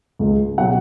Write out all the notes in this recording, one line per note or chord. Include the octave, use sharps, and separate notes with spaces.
C#2
B2 F#3 F#5